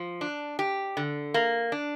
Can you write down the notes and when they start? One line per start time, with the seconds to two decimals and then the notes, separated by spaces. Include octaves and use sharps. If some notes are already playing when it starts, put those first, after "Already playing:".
Already playing: F3
0.21 D4
0.59 G4
0.97 D3
1.34 A#3
1.72 D4